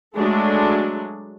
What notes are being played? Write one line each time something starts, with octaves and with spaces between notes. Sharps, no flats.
F#3 G#3 A3 D4